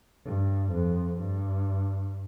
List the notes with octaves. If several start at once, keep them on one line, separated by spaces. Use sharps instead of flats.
G2
F2
G2